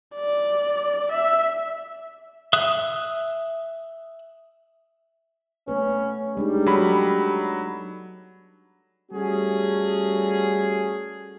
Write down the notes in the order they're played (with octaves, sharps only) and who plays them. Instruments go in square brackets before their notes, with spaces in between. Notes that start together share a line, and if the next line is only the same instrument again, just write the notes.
[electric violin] D5
E5
[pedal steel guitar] E5 D#6 F#6
[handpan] A3 B3 B4 [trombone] C#4
[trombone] G3 [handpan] G#3 D4 D#4
[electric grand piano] F#3 B5 [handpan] A4
[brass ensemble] G3 A3 C#4 F#4 G#4